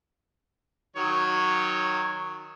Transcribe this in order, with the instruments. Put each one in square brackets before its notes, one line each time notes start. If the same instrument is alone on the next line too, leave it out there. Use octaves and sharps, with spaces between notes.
[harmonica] D#3 F#3 C#5